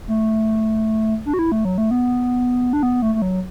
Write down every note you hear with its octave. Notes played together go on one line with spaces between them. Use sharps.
A3
D4
F#4
E4
A3
F#3
A3
B3
D4
B3
A3
A3
F#3